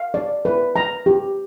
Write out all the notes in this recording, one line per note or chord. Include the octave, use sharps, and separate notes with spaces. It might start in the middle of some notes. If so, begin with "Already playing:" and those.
Already playing: F5
D5
B4
A#5
G4